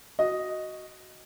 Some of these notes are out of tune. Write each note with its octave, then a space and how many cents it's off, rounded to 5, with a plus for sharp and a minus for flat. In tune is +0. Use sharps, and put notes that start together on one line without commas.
F#4 +0 D#5 +0